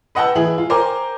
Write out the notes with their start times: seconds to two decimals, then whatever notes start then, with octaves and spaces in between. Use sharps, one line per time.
0.15 B4 D#5 F#5 G5 A5 E6
0.35 E3 E4 G#4 F#7
0.58 F4
0.70 A#4 C5 G5 G#5 D6